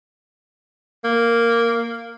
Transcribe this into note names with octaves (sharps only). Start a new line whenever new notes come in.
A#3